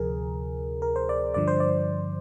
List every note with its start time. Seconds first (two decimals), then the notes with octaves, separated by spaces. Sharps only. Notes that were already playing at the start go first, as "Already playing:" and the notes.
Already playing: D2 C3 F3 G#4 A#4
0.82 A#4
0.96 C5
1.09 D5
1.34 G2 D3 F3 D5
1.48 C5
1.60 D5